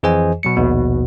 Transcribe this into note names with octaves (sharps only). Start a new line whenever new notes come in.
F2 E3 G#4 C5 D#5 G#5
B2 F#3 C#7
A#1 D#2 B2